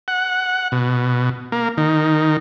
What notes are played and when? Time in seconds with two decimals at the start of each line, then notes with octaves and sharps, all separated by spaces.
0.08 F#5
0.72 B2
1.52 A#3
1.78 D#3